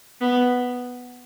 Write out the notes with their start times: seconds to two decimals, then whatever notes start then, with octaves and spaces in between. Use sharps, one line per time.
0.21 B3